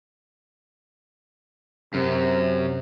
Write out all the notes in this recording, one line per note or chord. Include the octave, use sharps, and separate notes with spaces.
F#2 C3